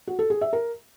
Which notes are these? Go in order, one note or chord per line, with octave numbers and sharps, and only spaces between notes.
F#4
A4
G#4
E5
A#4